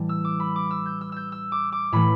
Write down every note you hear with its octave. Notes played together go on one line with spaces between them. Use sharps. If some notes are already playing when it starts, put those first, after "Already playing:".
Already playing: A2 E3 G3 A5
E6
D6
B5
D6
E6
G6
E6
E6 G6
E6
D6
D6
A2 E3 A3 B5